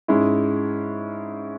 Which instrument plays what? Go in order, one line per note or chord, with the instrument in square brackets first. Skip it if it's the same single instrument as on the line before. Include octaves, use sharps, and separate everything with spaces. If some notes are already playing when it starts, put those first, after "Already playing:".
[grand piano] G#2 G#3 C#4 E4